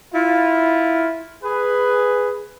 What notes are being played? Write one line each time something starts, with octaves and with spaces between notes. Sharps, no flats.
E4 F4
G#4 B4